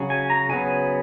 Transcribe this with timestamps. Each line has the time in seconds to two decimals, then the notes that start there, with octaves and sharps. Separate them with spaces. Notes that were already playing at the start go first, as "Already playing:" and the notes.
Already playing: C#3 F#3 C#4
0.10 G#5
0.30 A#5
0.49 C#3 F#3 B3 G#5